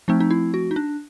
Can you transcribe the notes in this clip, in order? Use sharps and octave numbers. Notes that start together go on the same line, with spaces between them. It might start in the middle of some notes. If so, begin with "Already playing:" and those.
F3 A3 C4 D#4
D#4
E4
F#4
D#4
D4